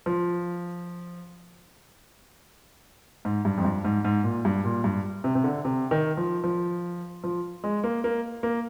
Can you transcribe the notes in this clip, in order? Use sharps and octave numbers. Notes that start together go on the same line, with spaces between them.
F3
G#2
G2
F2
G2
G#2
G#2
A#2
G2
A#2
G2
C3
C3
D3
C3
D#3
F3
F3
F3
G#3
A#3
A#3
A#3